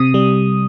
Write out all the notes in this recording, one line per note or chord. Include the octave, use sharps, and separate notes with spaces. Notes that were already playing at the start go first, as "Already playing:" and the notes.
Already playing: C3 D#6
G3